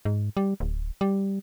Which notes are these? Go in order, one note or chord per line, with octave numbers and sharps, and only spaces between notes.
G#2
G3
D1
G3